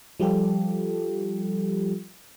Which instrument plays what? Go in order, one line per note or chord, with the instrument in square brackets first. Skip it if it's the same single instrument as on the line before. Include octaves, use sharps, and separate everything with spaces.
[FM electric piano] F3 G3 F4 G4 A4